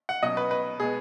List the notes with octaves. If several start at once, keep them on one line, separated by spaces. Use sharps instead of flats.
F#5
B2 F#3 C#4 D#5
B4
B4
B2 G#3 B3 G#4